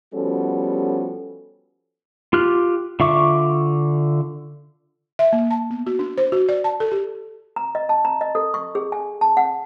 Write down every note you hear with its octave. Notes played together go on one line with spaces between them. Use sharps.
F3 G3 B3 C#4 F#4 A4
F4 G4 F6 F#6
D3 F4 E5 C#6 D6
E5
A#3
A5
B3
F#4
D4
C5
F#4
D5
A5
A4
G4
A#5
D#5
A5
A#5
D#5
A4
C#6
G#4
G#5
A5
F#5